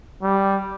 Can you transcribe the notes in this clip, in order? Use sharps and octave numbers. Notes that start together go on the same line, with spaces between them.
G3